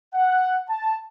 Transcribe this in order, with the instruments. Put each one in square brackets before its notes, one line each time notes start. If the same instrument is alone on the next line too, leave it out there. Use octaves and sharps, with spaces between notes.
[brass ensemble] F#5
A5